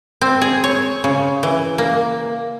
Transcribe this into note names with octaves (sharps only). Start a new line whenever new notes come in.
C4
G#4
C#5
C#3
E3
A#3